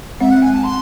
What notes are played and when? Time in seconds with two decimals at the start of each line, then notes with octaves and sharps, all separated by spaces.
0.20 G#3 C4 E5
0.31 F#5
0.42 G#5
0.53 A5
0.64 C6